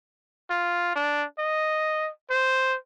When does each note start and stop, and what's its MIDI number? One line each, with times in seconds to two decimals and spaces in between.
0.50 0.92 65
0.96 1.25 62
1.38 2.10 75
2.30 2.77 72